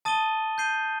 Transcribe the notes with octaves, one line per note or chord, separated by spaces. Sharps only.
A5 D#6 A6 D#7 G7
G6 C7 D#7 G7